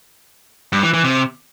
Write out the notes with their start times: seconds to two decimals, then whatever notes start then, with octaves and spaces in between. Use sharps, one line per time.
0.73 G2
0.83 E3
0.94 E3
1.04 C3